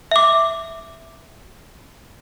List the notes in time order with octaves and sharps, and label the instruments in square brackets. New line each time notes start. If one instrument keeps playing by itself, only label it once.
[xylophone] E5 D6